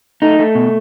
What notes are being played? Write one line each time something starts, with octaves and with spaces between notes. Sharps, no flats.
A3 D#4
A3
B2